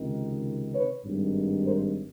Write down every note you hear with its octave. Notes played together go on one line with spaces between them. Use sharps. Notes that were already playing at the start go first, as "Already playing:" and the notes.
Already playing: C#2 C3 D#3
B4 C#5
G#1 G2 D#3
A#4 C5